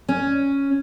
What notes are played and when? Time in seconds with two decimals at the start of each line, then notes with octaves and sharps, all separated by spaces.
0.08 C#4